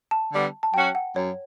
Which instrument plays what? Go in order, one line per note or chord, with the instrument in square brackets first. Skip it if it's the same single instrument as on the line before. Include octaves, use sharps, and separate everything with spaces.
[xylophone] A5
[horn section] D3 G3 B3
[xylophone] A5
[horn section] F#3 C#4 F#4 [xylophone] G5
[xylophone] F#5
[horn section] F#2 [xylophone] C#5